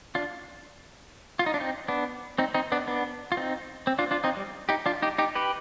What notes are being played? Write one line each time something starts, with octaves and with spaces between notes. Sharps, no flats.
D4 F4
F4
D#4
D4
C4 D#4
B3 D4
C4 D#4
C4 D#4
B3 D4
B3 D4
F4
C4 D#4
C4
D4 F4
D4 F4
C4 D#4
G3
D#4 G4
D4 F4
D#4 G4
D#4 G4
G4 B4